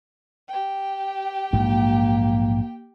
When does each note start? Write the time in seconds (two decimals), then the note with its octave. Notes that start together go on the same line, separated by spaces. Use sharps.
0.48 G4 G5
1.53 A#1 G#2 F#3 A#3